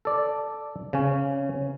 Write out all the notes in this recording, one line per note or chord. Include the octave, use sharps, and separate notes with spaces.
A4 D5
C#3 C#4